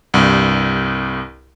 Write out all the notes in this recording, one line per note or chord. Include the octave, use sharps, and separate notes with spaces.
C2 G2